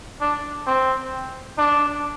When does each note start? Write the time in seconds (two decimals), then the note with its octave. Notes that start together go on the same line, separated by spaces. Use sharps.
0.21 D4
0.67 C4
1.58 D4